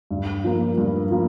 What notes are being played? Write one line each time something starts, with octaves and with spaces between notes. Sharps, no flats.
G2
F3 A#3
G2
F3 A#3